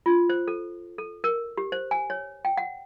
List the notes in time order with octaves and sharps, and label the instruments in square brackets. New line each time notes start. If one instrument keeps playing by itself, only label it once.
[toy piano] F4
C5
A4
A4
A#4
G4
C5
G#5
C#5
G5
F#5